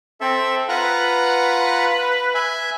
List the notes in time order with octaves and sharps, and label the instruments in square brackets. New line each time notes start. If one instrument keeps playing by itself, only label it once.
[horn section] C4 [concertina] A4 E5
[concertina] F4 F#5 A#5 [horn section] B4
[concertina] E5 G#5